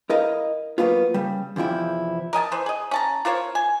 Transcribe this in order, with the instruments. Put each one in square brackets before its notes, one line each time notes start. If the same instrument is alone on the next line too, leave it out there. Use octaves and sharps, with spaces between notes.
[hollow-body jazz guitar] E4 A#4 D#5 F5
F#3 G#3 A#3 B3 F4
C#3 G3
E2 C3 F3 E4 G5
[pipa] A#4 D#5 G#5 A5
E3 C5
G#4 D#5
C#4 A5 A#5
F4 A#4 C5 C#5
G#5